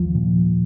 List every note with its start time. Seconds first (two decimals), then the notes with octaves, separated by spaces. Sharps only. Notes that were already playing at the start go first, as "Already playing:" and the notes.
Already playing: D#2 F3
0.15 A#2